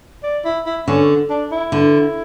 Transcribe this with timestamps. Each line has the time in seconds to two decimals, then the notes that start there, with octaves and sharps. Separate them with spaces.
0.23 D5
0.44 E4
0.66 E4
0.87 D3 C#4
1.30 D4
1.52 E4
1.72 D3